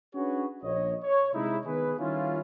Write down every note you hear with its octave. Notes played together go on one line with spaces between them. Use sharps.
C#4 D4 F#4 G#4 B4 C#5
A#1 C#5 D#5
C#5
C3 G#3 D#4 E4
D#3 B3 G#4 B4
D#3 G3 C#4 E4 F4